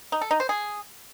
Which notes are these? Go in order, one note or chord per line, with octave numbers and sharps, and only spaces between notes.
D#4
A4
D#4
C5
G#4